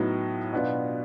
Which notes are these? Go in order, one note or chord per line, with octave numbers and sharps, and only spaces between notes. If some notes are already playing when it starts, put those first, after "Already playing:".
Already playing: A2 F#3 B3 D#4
B2 F#3 B3 D4 F4